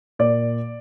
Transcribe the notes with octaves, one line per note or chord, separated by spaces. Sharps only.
A#2 D5